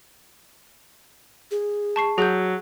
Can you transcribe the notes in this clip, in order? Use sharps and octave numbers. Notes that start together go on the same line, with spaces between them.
G#4
A5 C#6 C7
F#3 G#4 G6